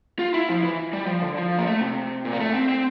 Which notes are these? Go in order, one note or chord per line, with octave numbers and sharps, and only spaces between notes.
F4
E4
F3
E3
G3
F3
D3
F3
A#3
A3
C3
A#2
A#3
A3
C4
C4